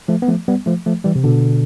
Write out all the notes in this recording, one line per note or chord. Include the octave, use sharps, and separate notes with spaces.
F3 A3
B3
F3 A3
G3 B3
F3 A3
F3 A3
E3 G3
C3
B2 D3